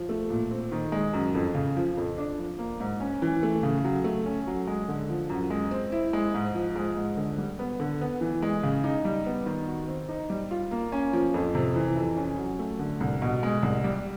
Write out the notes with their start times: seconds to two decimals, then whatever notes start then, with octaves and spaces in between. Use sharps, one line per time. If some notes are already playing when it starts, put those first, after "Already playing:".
Already playing: F3
0.09 A3
0.30 A#2
0.51 C4
0.72 D#3
0.92 G#3
1.14 F#2
1.35 F2
1.55 C#3
1.76 F3
1.97 F2
2.18 D4
2.39 F3
2.59 A#3
2.80 G#2
3.00 C#4
3.22 E3
3.43 A3
3.63 C#3
3.84 F#3
4.04 A3
4.26 C#4
4.47 F#3
4.67 G#3
4.88 D3
5.10 F3
5.30 F#2
5.50 G#3
5.71 C4
5.92 E4
6.13 G#3
6.34 G#2
6.55 F3
6.76 G#3
6.97 G#2
7.17 D3
7.38 G3
7.59 B3
7.80 D3
8.01 B3
8.21 E3
8.42 G#3
8.63 C#3
8.84 D#4
9.05 G3
9.26 B3
9.46 D#3
9.67 F#4
9.88 C4
10.09 D#4
10.30 G3
10.51 F4
10.71 A#3
10.92 C#4
11.13 F3
11.34 F2
11.55 C3
11.76 E3
11.96 F2
12.17 C#4
12.38 F#3
12.59 A3
12.79 D3
13.00 C2
13.22 B2
13.43 G#3
13.62 C2
13.84 G3